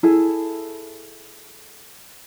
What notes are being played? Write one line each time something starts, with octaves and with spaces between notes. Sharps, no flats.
E4 G#4 A4